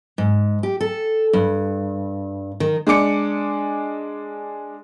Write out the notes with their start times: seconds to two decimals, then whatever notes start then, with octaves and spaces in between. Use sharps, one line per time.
0.18 G#2
0.63 G4
0.80 A4
1.33 G2
2.60 D#3
2.87 G#3 D4 D6 C#7